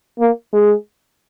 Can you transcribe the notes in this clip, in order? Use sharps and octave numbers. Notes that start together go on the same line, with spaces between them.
A#3
G#3